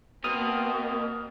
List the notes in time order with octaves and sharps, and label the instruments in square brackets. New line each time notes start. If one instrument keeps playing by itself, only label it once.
[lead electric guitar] B2 [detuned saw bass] A#3 [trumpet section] C4 [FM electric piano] D#6 F6